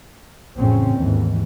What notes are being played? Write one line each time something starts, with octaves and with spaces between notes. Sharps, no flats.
A1 F2 A2 C#3 C4 C#4
D#2 G#2 E3